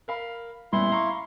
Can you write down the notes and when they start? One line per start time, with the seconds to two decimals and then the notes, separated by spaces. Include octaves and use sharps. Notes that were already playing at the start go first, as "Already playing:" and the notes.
0.08 A#4 F5 B5
0.73 A1 A#2 G3 B3 E4 C6
0.92 F5 A#5 C#6